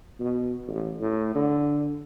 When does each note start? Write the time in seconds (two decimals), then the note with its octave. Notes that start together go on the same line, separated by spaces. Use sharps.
0.19 B2
0.68 A1
1.00 A2
1.35 D3